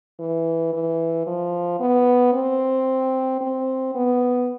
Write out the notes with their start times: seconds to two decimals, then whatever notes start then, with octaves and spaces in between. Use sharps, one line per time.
0.20 E3
0.73 E3
1.27 F3
1.80 B3
2.33 C4
3.41 C4
3.95 B3